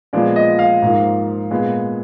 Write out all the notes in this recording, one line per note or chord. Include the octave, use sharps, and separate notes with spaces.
A#2 F3 G#3 B3 D5
D#5
F5
G#2 F3 A#3
A#2 G#3 B3